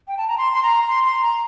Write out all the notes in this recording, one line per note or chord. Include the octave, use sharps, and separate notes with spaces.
G5
A5
A#5
C6
C6
A#5
C6
C6
A#5